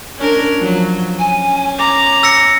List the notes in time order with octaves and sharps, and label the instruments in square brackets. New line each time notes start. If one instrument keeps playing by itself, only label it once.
[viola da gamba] C#4 D4 A#4
F3 F#3
[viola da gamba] C#4 [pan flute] G#5
[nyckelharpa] A#5 [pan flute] D6
[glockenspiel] E6 A#6 C#7